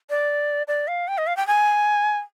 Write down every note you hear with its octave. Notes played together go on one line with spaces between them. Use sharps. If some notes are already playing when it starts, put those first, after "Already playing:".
D5
D5
F5
G5
D#5
F5
G5
G#5